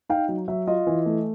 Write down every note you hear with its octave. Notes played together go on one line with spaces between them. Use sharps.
D#4 F5 G5
F#3
F#3 E5
F4 D#5
E3
A3